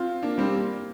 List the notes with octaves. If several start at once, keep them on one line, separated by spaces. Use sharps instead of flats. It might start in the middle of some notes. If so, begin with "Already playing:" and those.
Already playing: C4 F4
A#3 D4
G3 C4
A#3